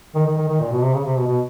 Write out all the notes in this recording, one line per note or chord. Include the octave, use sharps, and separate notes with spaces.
D#3
D#3
D#3
D#3
A#2
B2
C3
C#3
C3
B2
B2